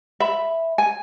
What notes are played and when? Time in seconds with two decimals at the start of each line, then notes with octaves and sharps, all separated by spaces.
0.20 E5 B5
0.78 G#5